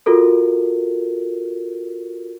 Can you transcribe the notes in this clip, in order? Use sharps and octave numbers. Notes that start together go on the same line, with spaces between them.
F4 F#4 A4 A#4